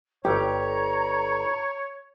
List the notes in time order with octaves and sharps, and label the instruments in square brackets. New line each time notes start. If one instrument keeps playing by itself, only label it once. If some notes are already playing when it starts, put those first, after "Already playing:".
[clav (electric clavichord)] G1 [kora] G4 [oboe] C#5 [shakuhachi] A#5